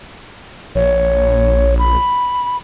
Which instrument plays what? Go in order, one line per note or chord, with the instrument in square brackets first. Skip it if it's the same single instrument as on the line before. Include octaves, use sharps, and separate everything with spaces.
[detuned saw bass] A#1 [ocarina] C#5
[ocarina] B5